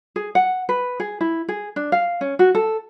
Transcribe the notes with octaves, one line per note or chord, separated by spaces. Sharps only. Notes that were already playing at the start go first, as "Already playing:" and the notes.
G#4
F#5
B4
G#4
E4
G#4
D4
F5
C#4
F#4
A4